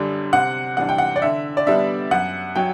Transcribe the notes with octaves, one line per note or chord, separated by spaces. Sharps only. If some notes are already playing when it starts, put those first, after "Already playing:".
Already playing: F#2 D3 G3 D4
C3 F#5
E3 G3 D4 F#5
G5
F#5
D5
D3 E5
D5
G3 B3 D4 E5
F#2 F#5
F#3 G5